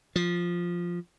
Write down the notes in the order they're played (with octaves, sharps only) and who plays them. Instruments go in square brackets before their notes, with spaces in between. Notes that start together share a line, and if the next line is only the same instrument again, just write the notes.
[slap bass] F3